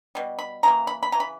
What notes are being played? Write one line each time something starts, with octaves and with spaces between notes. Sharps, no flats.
B2 G3
B5
C#3 E3 A#3 A#5
B5
B5
C#3 E3 A#5
B5